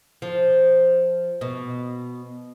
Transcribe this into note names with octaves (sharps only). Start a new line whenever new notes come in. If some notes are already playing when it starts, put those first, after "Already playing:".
F3
B2